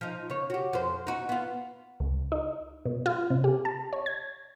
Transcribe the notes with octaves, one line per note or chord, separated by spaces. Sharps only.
F3 D#4
C#3 C#5
F#4 G4
F2 C5
D#4 F#4
B3 F4
C#2
D#4
B2
F4
C3
G4
A5
C#5
G#6